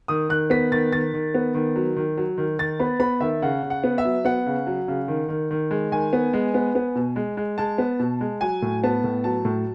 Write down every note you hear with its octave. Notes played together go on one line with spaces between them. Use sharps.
D#3 D#6
D#3 F#6
B3 B6
D#3 A6
D#3 A6
D#3
B3
D#3
F#3
D#3
F#3
D#3
D#3 A6
B3 B5
B3 B5
D#3 E5
C#3 F#5
C#3
F#5
B3
E5
F#3
B3 F#5
C#3
F#3
C#3
D#3
D#3
D#3
G#3
D#3 G#5
B3
G#3
B3
B3
B2
G#3
G#3
G#3 A5
B3
B2
G#3
F#3 G#5
A2
B3 A5
A2
F#3 A5
A2